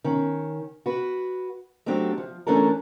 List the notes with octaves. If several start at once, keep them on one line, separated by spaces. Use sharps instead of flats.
D#3 C#4
F#4 B4
F#3 A3 C4 D4 G4
F3
E3 A3 C#4 D4 A4 A#4